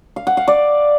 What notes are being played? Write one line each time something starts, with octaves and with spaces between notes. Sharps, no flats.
F5
F#5
F5
D5